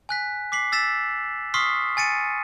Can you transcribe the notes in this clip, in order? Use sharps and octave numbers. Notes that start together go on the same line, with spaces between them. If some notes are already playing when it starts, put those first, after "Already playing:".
G#5 F#6 B6
D6 B6 C7 F#7
E6 A6 B6 E7
C6 C#6 D#6 F6 B6 C7
G#5 A6 C#7 D#7